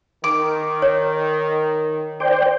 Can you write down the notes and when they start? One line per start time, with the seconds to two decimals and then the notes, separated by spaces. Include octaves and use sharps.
0.24 D#3 D6
0.82 C#5
2.20 C5 D5 G5